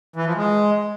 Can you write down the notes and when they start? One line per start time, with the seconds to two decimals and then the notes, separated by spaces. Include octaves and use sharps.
0.16 E3
0.26 F3
0.36 G#3